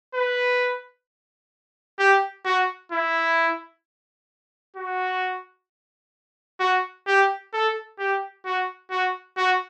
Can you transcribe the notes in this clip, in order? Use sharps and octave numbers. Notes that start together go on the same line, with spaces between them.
B4
G4
F#4
E4
F#4
F#4
G4
A4
G4
F#4
F#4
F#4